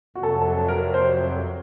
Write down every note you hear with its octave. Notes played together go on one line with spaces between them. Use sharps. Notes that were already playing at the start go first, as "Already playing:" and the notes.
F2 C3 F#3 F#4
A4
F#4
A4
A#4
C5